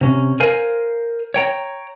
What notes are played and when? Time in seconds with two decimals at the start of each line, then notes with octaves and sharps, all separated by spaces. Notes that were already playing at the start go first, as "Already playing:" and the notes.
0.01 C3 C#4
0.40 A#4 C5 F5 G#5
1.34 C#5 G5 A#5